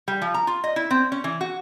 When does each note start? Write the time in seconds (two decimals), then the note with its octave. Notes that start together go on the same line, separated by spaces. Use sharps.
0.08 G3
0.22 F3
0.34 A#5
0.47 F4
0.64 D#5
0.76 E4
0.91 C4
1.12 C#4
1.24 E3
1.41 F#4